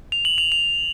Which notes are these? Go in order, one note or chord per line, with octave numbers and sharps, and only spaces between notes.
F7
F#7
F7
F7